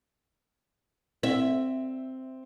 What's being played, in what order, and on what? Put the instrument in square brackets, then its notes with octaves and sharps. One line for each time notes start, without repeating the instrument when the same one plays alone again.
[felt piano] C4 [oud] E5